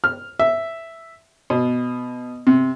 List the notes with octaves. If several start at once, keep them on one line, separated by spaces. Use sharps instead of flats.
F6
E5
B2
C3